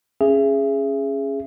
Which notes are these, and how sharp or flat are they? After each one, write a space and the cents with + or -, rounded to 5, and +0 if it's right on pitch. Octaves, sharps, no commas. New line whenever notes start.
C#4 -10 G#4 +0 E5 +25